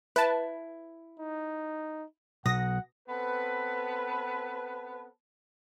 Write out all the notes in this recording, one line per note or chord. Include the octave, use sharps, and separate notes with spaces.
E4 B4 A5
D#4
B1 F#5 D#6 A#6
B3 C4 A4 B4